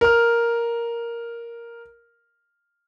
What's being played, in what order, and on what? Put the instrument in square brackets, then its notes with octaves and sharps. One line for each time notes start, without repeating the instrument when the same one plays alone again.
[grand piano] A#4 F6